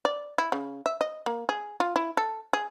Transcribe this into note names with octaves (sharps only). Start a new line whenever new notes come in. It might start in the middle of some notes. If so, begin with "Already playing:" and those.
D5
E4
C#3
E5
D#5
A#3
G#4
F4
E4
A4
G#4